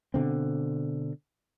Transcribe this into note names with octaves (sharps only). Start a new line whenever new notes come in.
B2 D3 C4